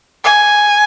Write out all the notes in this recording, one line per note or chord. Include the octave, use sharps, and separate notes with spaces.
G#5